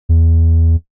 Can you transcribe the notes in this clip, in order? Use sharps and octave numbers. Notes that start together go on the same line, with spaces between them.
E2